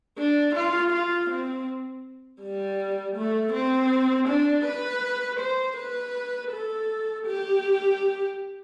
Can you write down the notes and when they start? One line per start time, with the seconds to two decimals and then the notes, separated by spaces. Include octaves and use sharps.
0.18 D4
0.55 F4
0.93 F4
1.30 C4
2.41 G3
3.16 A3
3.53 C4
4.28 D4
4.66 B4
5.40 C5
5.77 B4
6.51 A4
7.26 G4